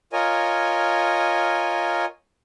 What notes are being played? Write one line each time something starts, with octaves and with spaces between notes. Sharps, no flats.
F4 A#4 C#5 D#5 G#5